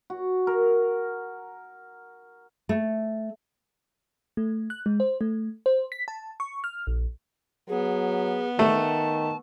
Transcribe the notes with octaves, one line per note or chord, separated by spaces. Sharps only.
F#4
A#4
A3
A3
F#6
G#3
C5
A3
C5
B6
A5
C#6
F6
A#1
F#3 B3 G#4
D#3 A3 A5